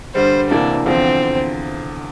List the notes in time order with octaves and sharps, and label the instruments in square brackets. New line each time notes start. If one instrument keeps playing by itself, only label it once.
[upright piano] G2 D3 G3 [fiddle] C5
[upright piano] D2 C3 E3 A#3 [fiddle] D4
[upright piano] E2 D3 F3 [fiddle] C4